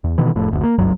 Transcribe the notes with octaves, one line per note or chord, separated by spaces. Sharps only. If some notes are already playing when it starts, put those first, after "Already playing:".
E2
B2 D#3 E3
F1 F2 A2
F#1 D2
A#3
F#1 C#2 G2 F#3